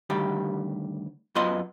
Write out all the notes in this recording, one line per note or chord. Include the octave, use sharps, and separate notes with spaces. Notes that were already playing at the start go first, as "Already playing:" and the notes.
D2 D#3 G3 G4
F#2 B3 F4 D#5 C6